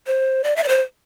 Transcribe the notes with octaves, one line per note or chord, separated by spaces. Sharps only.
C5
D5
E5
D5
C5